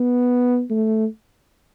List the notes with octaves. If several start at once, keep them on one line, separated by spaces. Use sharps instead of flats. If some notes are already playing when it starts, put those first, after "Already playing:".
Already playing: B3
A3